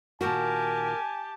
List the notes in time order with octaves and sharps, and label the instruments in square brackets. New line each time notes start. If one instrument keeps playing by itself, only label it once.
[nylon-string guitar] A#2 D#3 F#4 [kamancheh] G4 A5 [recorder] A#4 [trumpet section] G#5